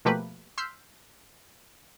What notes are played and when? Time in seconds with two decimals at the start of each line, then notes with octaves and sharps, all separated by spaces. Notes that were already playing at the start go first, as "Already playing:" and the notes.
0.05 B2 F3 A3 A#3 G4 B4
0.58 C6 E6 F6 G6 B6 C7